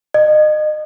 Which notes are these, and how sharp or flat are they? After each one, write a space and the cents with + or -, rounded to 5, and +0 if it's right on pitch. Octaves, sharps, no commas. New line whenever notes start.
D#5 -30